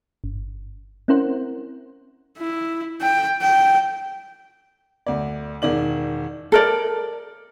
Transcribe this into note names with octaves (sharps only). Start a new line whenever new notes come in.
G1
C4 C#4 E4 A#4 C5 F#5
E4
G5
G5
D2 D5
E1 D#3 D5 F#7
A4 A#4 D5